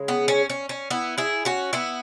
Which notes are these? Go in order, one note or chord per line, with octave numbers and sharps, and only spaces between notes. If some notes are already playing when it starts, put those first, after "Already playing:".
Already playing: C#3 G#3
B3
C#4
C#4
C#4
B3 E4
E4 G#4
C#4 F#4
B3 E4